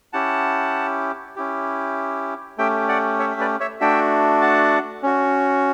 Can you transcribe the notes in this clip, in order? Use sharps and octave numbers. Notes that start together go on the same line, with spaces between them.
C#4 E4 G4 F#5 A5
C#4 E4 G4
A3 C#4 G4 E5 G5
D5 F#5
C#5 E5
E5
B4 D5
C#5 E5
A3 D4 F#4 E5 G5
F#5 A5
C#4 F#4